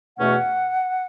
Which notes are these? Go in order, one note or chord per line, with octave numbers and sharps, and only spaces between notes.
E2 B2 A3 C#4 F#5